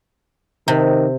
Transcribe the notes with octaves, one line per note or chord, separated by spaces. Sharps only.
C3 D#3